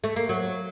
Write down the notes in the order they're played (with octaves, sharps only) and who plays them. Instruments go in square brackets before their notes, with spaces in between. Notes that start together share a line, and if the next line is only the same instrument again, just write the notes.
[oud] A3
A#3
F#3